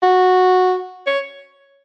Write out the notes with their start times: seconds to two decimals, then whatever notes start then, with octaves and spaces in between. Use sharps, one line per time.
0.02 F#4
1.06 C#5